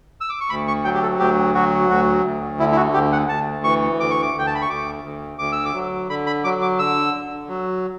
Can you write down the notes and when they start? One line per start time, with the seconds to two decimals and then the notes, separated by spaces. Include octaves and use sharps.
0.21 E6
0.29 D6
0.41 C#6
0.50 D2 B5
0.68 C#6
0.84 F#3 G5
0.94 G4
1.03 A4
1.19 D2 G4
1.54 F#3 F#4
1.89 D2 F#4
2.25 D2
2.60 D3 E4
2.72 E4
2.77 F#4
2.94 D2 G4
3.12 F#5
3.29 D2 A5
3.64 E3 C#6
3.99 D2 D6
4.10 C#6
4.22 D6
4.34 D2 G5
4.47 A5
4.55 B5
4.62 C#6
4.70 D2 D6
5.04 D2
5.39 D2 D6
5.52 E6
5.65 D6
5.74 F#3
6.09 D3 B5
6.27 B5
6.44 F#3 D6
6.62 D6
6.79 D3 E6
7.14 D3
7.48 F#3